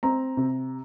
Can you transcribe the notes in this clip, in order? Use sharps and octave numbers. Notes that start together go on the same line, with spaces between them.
C4 A#5
C3